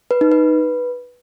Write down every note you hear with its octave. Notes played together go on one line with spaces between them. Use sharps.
B4
D#4
B4